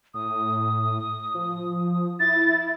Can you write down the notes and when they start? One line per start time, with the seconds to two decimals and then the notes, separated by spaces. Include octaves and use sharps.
0.14 A2 D#6
1.34 F3
2.20 E4 A6